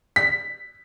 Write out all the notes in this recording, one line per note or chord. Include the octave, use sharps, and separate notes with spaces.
B6